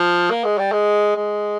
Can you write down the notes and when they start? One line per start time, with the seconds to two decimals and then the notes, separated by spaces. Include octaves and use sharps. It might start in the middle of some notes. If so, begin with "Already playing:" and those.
Already playing: F3
0.31 A#3
0.44 G#3
0.58 G3
0.72 G#3
1.16 G#3